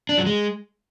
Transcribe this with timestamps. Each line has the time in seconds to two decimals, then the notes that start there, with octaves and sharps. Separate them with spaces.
0.09 D4
0.18 F#3
0.26 G#3